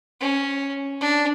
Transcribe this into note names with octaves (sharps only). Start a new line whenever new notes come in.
C#4
D4